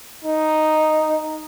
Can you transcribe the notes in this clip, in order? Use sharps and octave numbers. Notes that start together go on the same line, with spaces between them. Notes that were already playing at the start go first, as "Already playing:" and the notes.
D#4